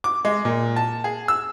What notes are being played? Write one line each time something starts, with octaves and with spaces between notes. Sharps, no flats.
D6
G#3
A#2
A5
G#4
E6